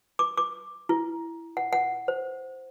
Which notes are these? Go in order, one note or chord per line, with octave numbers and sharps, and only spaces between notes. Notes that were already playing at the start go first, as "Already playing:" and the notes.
D6
D6
E4
F#5
F#5
C5